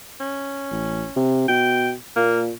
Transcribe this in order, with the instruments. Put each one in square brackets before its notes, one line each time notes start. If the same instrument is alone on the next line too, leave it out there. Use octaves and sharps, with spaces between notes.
[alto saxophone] C#4
[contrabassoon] A1
C3
[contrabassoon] B2 [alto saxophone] G5
[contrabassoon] A#2 [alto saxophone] A#3